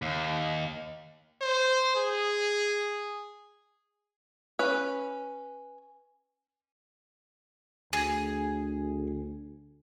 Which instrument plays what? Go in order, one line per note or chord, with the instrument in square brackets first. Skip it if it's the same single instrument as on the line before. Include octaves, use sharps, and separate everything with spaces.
[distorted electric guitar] D#2
[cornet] C5
G#4
[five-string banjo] C#4 B4
[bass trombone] D2 [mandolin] G#4